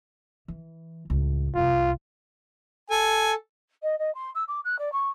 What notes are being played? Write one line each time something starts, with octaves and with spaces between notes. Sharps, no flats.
E3
C#2 A2
F1 C2 F4
A4 G#5
D#5
D#5
C6
E6
D6
F#6
D5
C#6